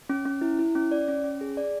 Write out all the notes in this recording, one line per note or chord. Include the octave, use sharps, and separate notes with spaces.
C#4
C#4
E4
E4
C#4
D5
C#4
C#4
G#4
D5